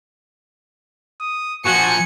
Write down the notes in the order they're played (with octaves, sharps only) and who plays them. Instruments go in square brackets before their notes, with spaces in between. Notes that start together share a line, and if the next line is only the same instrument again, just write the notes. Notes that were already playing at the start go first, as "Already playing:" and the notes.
[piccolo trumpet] D#6
[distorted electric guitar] A#2 F3 [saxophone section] F#4 [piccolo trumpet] G#5 [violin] C#7